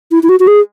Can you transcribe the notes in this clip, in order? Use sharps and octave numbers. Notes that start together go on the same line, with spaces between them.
E4
E4
F#4
F#4
G#4